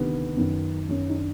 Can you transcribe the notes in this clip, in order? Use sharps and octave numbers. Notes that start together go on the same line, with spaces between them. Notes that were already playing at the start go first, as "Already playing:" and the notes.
Already playing: D2 C3 D#3 B3
F#2 D#3
F#2 D#3 C#4
D#4
D4